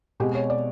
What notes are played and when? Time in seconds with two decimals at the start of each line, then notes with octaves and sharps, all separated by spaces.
0.20 B2 G#3 C4 G4
0.35 C#5
0.50 D5